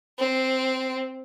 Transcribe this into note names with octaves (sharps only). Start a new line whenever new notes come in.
C4